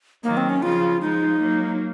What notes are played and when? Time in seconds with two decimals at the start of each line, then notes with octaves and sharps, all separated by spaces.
0.23 D#3 F#3 A#3
0.37 C4
0.49 C#4
0.62 C#3 F3 F4
1.01 F3 G#3 D#4
1.40 F#3 A#3